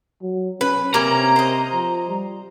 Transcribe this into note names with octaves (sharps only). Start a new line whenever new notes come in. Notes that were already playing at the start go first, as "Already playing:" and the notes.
F#3
C#4 B4
C3 A#3 C#4 A#5
C5 D#5
F3
G3